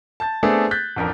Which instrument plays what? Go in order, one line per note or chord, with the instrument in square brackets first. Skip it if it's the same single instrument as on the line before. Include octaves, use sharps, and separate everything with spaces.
[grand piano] A5 G6 A6
A3 B3 C4 D4 G#4 A4
F#6 G6 A6 B6
A1 F2 D4 A#4